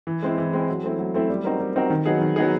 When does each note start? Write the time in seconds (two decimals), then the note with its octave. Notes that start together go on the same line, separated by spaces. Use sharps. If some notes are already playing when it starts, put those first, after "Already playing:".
0.07 E3
0.23 G#3 C4 E4
0.38 E3
0.53 G#3 C4 E4
0.69 F#3
0.83 A3 C4 E4
0.99 F#3
1.14 A3 C4 E4
1.29 G3
1.44 C4 D#4 F#4 A#4
1.60 G3
1.76 C4 D#4 F#4 A#4
1.90 D#3
2.06 F#3 B3 D#4 G#4
2.21 D#3
2.36 F#3 B3 D#4 G#4